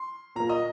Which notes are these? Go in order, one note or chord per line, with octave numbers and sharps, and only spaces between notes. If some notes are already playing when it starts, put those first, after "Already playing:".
Already playing: C6
A#2 A#3 A#5
D#5